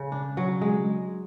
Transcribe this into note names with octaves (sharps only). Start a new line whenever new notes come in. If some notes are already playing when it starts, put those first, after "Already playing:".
Already playing: C#3
D4
F#3
G#3